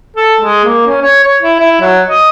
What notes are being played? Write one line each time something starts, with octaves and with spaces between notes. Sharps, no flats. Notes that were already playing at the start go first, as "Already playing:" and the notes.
A4
G#3
A#3
C#4
C#5
C#5
E4
E4
F#3
D#5